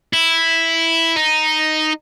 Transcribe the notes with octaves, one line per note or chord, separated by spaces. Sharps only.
E4
D#4